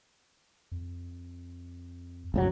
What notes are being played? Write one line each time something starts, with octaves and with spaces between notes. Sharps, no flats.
F2
F#1 C#2 C3 F#3